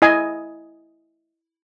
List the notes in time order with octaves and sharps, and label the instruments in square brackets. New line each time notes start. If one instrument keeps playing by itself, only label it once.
[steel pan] E4 D#5 G#5